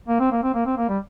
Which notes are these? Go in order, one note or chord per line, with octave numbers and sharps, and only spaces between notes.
A#3
C4
A#3
C4
A#3
C4
A#3
G3